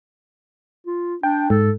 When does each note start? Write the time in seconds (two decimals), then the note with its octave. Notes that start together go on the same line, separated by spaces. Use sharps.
0.87 F4
1.23 D4 G5
1.50 G#2 A4